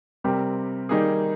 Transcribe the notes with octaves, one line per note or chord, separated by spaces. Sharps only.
C3 G3 C4 G4 A#4
D#3 G3 A#3 D#4 G#4